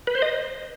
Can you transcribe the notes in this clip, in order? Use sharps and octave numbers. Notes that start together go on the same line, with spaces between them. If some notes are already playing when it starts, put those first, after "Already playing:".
B4
C5
D#5